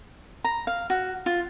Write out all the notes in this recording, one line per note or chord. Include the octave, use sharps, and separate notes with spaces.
A#5
F5
F#4
F4